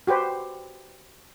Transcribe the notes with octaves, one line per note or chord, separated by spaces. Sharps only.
F#4 G4 B4 C5